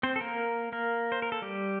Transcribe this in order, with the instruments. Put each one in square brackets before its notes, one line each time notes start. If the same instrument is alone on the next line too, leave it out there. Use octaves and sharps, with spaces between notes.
[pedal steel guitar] C4 C5
A4
A#3 A#4
A#3 A#4
C5
A#4
A4
G3 G4